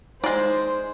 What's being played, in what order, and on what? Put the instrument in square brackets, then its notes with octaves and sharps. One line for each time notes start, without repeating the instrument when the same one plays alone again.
[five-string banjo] G#3 D5 [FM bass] D#4 [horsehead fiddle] C5